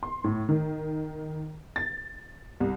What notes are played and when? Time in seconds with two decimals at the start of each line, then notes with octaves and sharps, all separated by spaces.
0.03 C6
0.24 A2
0.49 D#3
1.76 A6
2.60 C2